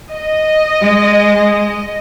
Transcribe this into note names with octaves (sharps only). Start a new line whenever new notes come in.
D#5
G#3